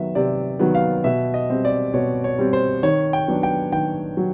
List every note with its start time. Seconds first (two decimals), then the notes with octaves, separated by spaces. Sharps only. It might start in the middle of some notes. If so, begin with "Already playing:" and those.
Already playing: D#3 F#3 B3 E5
0.15 C3 D5
0.59 D#3 F#3 B3
0.75 F5
1.04 B2 E5
1.34 D#5
1.50 G3 C4
1.65 D5
1.94 B2 C#5
2.24 C#5
2.39 G3 C4
2.53 C5
2.83 D#3 C#5
3.13 G5
3.28 F#3 B3 D4
3.43 G5
3.72 D#3 G5
4.17 F#3